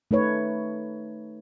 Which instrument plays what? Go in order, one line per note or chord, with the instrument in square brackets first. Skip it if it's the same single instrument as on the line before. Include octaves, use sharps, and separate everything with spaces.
[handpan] A3 D#4 B4 C#5